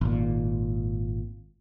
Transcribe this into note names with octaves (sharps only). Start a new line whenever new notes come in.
G#1 A#2